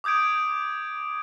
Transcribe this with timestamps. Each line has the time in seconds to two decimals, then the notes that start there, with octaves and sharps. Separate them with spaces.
0.04 D6 D#6 G6 G#6 D7